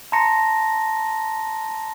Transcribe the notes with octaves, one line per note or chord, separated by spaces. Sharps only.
A5 A#5 C6 A#6 C#7